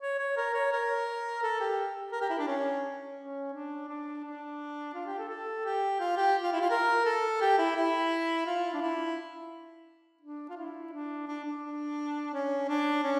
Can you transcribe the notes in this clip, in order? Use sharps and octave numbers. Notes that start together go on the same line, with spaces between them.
C#5
C#5
A#4
C#5
A#4
A4
G4
A#4
G4
E4
D4
C#4
C#4
D4
D4
D4
F4
G4
A4
A4
G4
F4
G4
F4
E4
F4
A#4
A4
G4
E4
E4
F4
D4
E4
D4
F4
E4
D4
D4
D4
C#4
D4
C#4